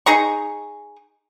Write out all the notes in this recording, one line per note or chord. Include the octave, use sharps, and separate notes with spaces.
D#4 G#4 A#5 C#6